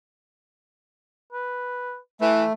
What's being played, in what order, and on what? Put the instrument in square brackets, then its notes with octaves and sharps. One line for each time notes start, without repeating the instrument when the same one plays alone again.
[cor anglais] B4
[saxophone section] E3 [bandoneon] A3 [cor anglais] E4